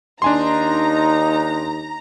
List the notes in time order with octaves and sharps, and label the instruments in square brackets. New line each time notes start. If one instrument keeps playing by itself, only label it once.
[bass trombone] D#2 [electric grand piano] D4 G#5 C6 [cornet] D#4 [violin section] A#5